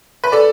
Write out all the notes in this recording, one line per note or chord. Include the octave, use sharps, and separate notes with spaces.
B4
A4 D5